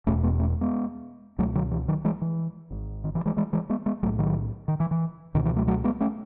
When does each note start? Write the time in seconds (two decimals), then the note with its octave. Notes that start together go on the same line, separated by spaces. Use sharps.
0.07 E1 E2 B2 A3 C#4
0.23 G#3 B3
0.40 A3 C#4
0.61 G#3 B3
1.38 C#2 B2 F#3 A3
1.55 D#3 F#3
1.71 E3
1.88 D#3 F#3
2.05 E3 G#3
2.22 E3
2.71 G#1 G#2
3.04 D#3
3.15 E3
3.26 E3 G#3
3.37 E3 G#3
3.53 E3 G#3
3.70 G#3 B3
3.86 G#3 B3
4.03 B1 A2 F#3 A3
4.19 D#3 F#3
4.68 D#3
4.80 E3
4.91 E3
5.34 C#2 B2 D#3
5.45 E3
5.56 F#3 A3
5.68 F#3 A3
5.84 G#3 B3
6.00 A3 C#4